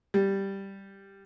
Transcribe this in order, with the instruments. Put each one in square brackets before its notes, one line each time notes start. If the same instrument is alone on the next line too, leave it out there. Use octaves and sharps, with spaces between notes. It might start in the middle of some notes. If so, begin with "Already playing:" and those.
[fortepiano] G3